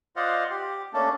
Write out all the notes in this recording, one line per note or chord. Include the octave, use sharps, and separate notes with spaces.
F4 C5 D5 D#5 F5 F#5
G4
A3 A#3 C#4 D4 A4